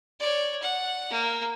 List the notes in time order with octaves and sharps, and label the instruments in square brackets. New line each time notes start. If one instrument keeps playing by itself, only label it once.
[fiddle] C#5 D5
F#5
A#3